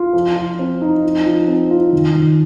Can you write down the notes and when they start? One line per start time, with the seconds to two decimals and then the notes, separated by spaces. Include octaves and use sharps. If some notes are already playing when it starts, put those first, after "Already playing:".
Already playing: F4
0.13 F3
0.37 F3
0.59 C4
0.82 D#4
1.03 F3
1.26 F3
1.48 C4
1.71 F4
1.93 D#3
2.15 D#3